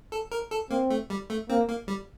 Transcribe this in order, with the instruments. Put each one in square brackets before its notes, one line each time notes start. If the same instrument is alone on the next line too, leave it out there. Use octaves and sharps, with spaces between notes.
[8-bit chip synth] A4
A#4
A4
[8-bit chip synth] A#3 [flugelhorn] C4
[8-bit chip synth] A3
G3
A3
[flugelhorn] A#3 [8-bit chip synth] C4
[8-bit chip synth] A#3
G3